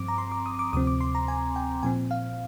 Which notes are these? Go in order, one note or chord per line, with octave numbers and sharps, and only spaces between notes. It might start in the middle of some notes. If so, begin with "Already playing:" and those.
Already playing: G2 F3 C4 D6
A#5
C6
D6
D#6
D6
D2 C3 F3 C4 D#6
D6
C6
A#5
G#5
G5
A#2 F3 C4 G#5
F5